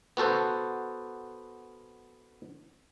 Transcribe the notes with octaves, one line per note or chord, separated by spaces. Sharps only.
B3 F#4 A4 C5